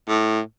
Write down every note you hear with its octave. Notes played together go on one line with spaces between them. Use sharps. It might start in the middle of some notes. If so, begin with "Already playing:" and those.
A2